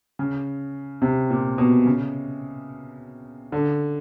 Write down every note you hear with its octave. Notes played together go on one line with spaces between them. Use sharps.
C#3
C3
A#2
B2
C#3
D3